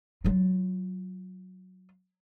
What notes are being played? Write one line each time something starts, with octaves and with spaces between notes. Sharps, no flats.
F#3 F4